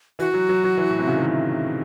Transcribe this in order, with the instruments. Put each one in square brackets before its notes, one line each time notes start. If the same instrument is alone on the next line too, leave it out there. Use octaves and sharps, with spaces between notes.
[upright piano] E3 [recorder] F#4
[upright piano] F#3
F#3
F#3
E3
A2
C3
C#3
D#3